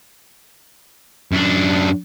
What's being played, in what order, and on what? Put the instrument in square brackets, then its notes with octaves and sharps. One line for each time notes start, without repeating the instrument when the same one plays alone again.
[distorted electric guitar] F#2 D4